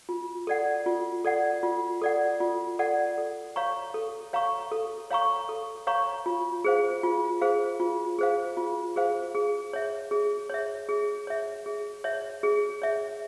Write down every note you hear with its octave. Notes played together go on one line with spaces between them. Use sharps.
F4
A4 D5 F#5
F4
A4 D5 F#5
F4
A4 D5 F#5
F4
A4 D5 F#5
A4
C#5 F5 A#5 C#6
A4
C#5 F5 A#5 C#6
A4
C#5 F5 A#5 C#6
A4
C#5 F5 A#5 C#6
F4
G#4 C5 F5
F4
G#4 C5 F5
F4
G#4 C5 F5
F4
G#4 C5 F5
G#4
C#5 E5
G#4
C#5 E5
G#4
C#5 E5
G#4
C#5 E5
G#4
C#5 E5